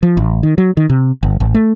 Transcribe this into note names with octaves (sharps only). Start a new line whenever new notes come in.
F3
A1
D#3
F#3
D#3
C3
G1
A1
A3